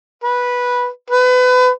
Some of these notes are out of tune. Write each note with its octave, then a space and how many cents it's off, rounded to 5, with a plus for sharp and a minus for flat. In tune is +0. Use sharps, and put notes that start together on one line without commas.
B4 -10
B4 +30